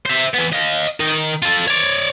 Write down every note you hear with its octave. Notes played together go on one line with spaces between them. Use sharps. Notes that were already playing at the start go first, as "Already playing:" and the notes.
C5 E5
E3 B3
D#5 F5
D#3 D#5
F4 A4
C#5 D5